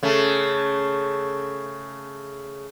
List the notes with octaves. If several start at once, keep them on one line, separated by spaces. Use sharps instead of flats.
C#3 A3